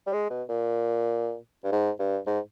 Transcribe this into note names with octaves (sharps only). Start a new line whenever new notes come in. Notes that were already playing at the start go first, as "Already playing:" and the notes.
G3
G#3
B2
A#2
G2
G#2
G2
G#2